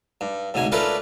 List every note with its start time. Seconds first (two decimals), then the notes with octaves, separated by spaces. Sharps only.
0.21 G2
0.54 D2 G#2 C3 G#5
0.72 A3 C#4 D4 F4 A#4 B4